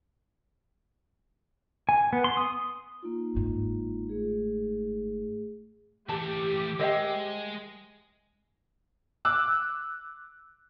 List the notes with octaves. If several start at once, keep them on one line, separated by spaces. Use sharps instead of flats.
G#5
B3
C6
D#6
A#3 D#4 F4
G1 G#2
A3 G#4
E3 A3 G4 A5
G#3 A#4 C5 D#5 E5 G5
D6 E6 F#6